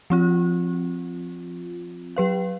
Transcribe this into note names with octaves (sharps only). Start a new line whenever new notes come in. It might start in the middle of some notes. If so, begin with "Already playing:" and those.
F3 C4 F4
F#3 B4 F5